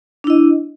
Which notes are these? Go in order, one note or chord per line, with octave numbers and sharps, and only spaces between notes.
D4 E4 D#5